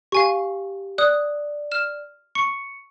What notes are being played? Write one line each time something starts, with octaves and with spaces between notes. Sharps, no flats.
G4 F5 G#5 C#6
D5 D#6 F#6
F6 E7
C#6 C#7